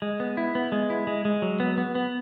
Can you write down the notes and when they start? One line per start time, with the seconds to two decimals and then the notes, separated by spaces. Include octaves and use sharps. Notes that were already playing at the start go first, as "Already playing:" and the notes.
0.02 G#3
0.20 B3
0.37 E4
0.55 B3
0.72 G#3
0.90 E4
1.07 G#3
1.25 G#3
1.42 F#3
1.60 B3
1.78 B3
1.95 B3